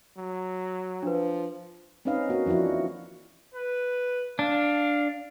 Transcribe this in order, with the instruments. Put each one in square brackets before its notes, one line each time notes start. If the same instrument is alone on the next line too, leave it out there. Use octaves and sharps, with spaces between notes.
[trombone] F#3
[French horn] F3 [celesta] D4 B4
[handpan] C4 C#4 D#4 B4 D#5 F5
A#3 F#4
E3 F3 D4 E4 F#4
[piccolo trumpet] B4
[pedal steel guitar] D4 [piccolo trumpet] F5